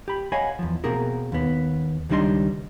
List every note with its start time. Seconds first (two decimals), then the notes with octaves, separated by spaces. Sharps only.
0.08 G4 B5
0.32 C#5 D#5 F5 F#5 G#5 B5
0.59 E2 F3
0.84 B2 A#3 C4 F#4 G#4 A#4
1.32 D#2 B3
2.09 C#2 D#3 G3 D4 D#5 C6